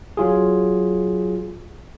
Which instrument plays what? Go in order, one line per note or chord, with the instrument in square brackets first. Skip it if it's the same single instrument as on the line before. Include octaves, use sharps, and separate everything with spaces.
[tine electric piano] F#3 F4 G#4